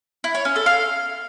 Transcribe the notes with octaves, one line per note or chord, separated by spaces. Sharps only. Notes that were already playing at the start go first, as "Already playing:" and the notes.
E4
C#5
C#4
A4
F5